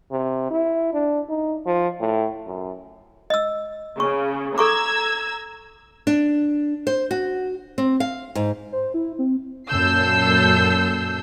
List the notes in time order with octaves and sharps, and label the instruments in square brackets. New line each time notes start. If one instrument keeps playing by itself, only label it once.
[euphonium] C3
E4
D4
D#4
F3
A2
F#2
[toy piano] D#5 E6
[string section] C#3 [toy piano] C#6
[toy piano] A4 C#6 D6 [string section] A#5 E6 G#6
[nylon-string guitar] D4
C5
F#4
C4
F5
G#2
[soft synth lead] C5
E4
C4
[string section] F#2 A#2 A4 E6 G6 C7